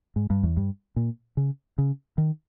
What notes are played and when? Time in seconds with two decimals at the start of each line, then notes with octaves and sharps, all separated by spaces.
0.16 G#2
0.30 G2
0.43 E2
0.57 G2
0.96 A#2
1.37 C#3
1.78 C#3
2.18 D#3